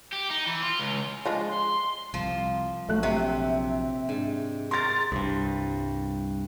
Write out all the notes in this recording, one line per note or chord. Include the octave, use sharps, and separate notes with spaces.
G4
D#4
E3
F4
C#2
F3 G#3 D4
C6
C2 F3
A#1 F#3 A3 F#6
C3 E5
G#2 D4
A#4 A#5 C6 A6
C2 G2